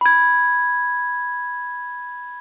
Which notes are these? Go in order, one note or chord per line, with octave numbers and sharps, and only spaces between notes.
B5 G#6